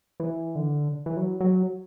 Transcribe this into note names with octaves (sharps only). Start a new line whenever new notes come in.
E3
D3
E3
F#3
F#3